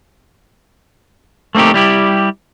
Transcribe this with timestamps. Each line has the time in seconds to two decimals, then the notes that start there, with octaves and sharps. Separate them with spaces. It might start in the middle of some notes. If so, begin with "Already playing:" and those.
1.55 A3 A#3 C4 D#4 G4
1.74 G3 E4 G4